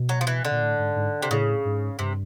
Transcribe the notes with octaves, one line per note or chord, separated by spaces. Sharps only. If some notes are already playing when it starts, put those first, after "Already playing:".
Already playing: B2
F#3
F3
E3
D3
A#2
A2
G#2
G#2
C3
A2 C#3
G#2
G2 C3